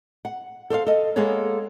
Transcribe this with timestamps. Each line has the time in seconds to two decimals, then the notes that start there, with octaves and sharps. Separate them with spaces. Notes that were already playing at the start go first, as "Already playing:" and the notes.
0.25 F#5
0.70 A4 C5 C#5 F5
0.87 A4 D#5
1.16 G#3 A#3 B3 G#4 A4 C#5